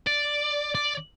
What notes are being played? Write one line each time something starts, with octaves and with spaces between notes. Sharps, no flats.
D5
D5